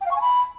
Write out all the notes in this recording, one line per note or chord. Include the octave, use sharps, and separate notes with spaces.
G5
F5
C#6
G#5
B5